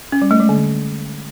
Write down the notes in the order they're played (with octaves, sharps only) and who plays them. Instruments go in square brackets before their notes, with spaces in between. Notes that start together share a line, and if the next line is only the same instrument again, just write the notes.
[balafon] C#4
G3
A3
G#3
D3